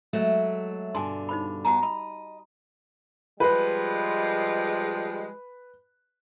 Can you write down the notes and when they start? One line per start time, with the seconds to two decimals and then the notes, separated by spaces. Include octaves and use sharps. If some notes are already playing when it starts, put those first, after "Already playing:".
0.13 F#3 G#3 A3
0.95 G2 B2 D3 G#5 A5 C6
1.29 D#4 C5 B5
1.65 G2 B3 F#4 A5 A#5
1.83 D#5 B5
3.40 F3 G3 G#3 B4